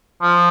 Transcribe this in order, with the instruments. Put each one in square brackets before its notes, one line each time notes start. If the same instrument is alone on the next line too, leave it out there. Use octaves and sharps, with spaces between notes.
[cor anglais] F3